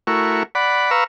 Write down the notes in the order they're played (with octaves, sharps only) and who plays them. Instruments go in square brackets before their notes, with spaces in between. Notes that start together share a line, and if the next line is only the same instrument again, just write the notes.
[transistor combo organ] A3 E4 F#4 A#4 C#6
D5 F#5 B5
B4 F5 A#5 C#6 E6